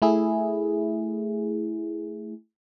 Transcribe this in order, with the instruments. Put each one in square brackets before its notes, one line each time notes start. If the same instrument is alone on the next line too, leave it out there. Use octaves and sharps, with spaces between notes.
[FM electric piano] A3 E4 G#4